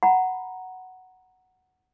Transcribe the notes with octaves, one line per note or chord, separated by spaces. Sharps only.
F#5 A#5 B5